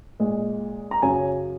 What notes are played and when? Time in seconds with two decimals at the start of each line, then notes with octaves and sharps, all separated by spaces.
0.20 A#2 G#3
0.91 A#5
1.02 F#2 C#3 F#3 G#5